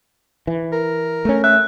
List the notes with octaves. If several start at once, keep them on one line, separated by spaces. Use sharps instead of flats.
E3
A#4
A3 C#4
E5 F#6